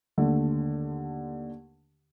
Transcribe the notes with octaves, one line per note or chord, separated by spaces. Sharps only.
D#2 D3 A3